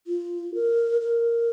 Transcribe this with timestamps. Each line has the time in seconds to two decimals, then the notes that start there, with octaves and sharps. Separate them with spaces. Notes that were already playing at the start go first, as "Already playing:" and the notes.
0.07 F4
0.54 A#4
1.01 A#4